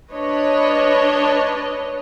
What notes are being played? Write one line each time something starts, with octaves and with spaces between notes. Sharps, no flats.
D4 B4 C#5 D#5